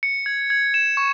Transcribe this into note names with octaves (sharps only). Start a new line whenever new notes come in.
C#7
G#6
G#6
E7
C#6